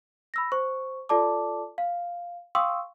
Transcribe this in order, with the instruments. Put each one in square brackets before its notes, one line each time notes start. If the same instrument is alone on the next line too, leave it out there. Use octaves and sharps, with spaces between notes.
[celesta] B5 E6 A#6
C5 C#6
F4 A4 D5 A5 D6
F5
F5 G5 C6 C#6 D#6 E6